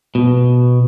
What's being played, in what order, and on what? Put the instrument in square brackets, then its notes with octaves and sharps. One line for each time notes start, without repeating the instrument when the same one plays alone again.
[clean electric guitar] B2